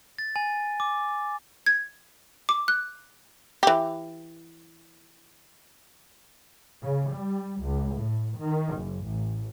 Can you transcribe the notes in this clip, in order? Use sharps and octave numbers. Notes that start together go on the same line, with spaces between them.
A6
G#5
D6
G#6
D6
F#6
E3 G4
C#3
G3
C#2
A2
D#3
F#1
A1